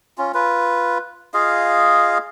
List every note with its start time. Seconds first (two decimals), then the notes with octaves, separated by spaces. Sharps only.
0.18 C#4 F4
0.34 F4 B4
1.34 F4 G#4 D#5 F5